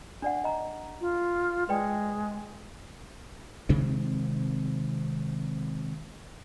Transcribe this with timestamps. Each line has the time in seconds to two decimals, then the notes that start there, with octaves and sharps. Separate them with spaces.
0.22 D4 D5 F#5
0.44 D#5 A#5
1.01 F4
1.69 G#3 B4 D5 G5
3.69 C3 D#3 G#3 C4